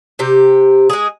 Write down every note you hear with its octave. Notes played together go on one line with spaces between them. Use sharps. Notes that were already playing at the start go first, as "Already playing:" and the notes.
C3 G4
G#3 G#4